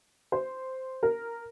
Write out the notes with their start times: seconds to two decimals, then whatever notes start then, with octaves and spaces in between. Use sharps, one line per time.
0.32 C5
1.03 A#4